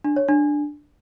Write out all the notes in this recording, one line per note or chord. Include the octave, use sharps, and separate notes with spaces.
D4
C#5
D4